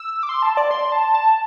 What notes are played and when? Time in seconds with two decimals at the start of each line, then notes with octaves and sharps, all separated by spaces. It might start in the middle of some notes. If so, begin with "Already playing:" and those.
Already playing: E6
0.23 D6
0.29 C6
0.42 A5
0.57 D5
0.71 C6
0.92 A5
1.14 A5